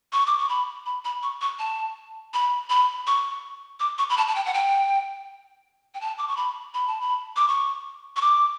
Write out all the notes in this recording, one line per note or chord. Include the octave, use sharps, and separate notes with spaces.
C#6
D6
C#6
B5
B5
B5
C#6
C#6
A5
B5
B5
C#6
D6
C#6
B5
A5
A5
G5
F#5
G5
G5
A5
D6
C#6
B5
B5
A5
B5
D6
C#6
C#6
D6